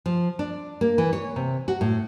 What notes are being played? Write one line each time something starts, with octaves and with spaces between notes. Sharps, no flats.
F3
D4
A#3
E3
C#5
C3
F#4
A2